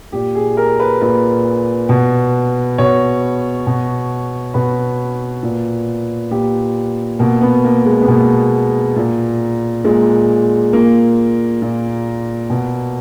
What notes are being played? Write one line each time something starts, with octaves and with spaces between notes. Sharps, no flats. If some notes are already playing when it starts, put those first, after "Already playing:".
A#2 G4
G#4
A#4
B4
A#2 B4
B2
B2 C#5
B2
B2 B4
A#2
A#2 G4
B2 A#3
B3
A#3
G#3
B3
B2 A#3
A#2
A#2 G#3
A#2 A#3
A#2
B2